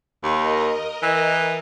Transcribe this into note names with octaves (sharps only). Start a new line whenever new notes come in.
D#2 A#4 D#5
E3